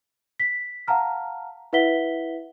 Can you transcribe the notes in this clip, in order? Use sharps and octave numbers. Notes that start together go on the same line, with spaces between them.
B6
F5 F#5 A5 A#5 F6
E4 B4 E5 F#5 B6 G7